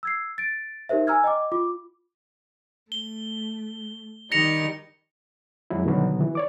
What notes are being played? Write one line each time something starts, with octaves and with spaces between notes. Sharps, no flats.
E6 G#6 C7
A6 D7
D#4 G4 A#4 C5 E5
G#5 A#5 E6 F6 G#6
D#5 G5 D6
F4 D6
A3 G7
D#3 G3 D#4 A#6 C#7 F7
F2 E3 F#3 G#3 E4
B2 D3 D#3 F#3 G3 B3
E3
C#5 D5 D6